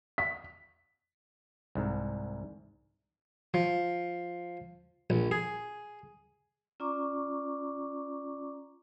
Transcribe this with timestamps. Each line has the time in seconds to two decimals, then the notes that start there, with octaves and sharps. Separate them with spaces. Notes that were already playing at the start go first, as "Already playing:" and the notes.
0.18 B6
1.75 C2 G#2
3.54 F3
5.10 A#1
5.31 G#4
6.80 C#4 F4 D5 A#5 C#6 D6